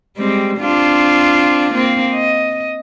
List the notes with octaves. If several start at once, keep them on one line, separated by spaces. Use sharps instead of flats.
G3 G#3 C4
C4 D4 F4
A#3 C4
D#5